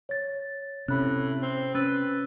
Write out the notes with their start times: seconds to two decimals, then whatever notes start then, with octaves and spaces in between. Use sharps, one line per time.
0.09 C#5 A6
0.88 A2 C3 C#4 B5 F#6
1.42 C4
1.75 C#4 B4 E6 A6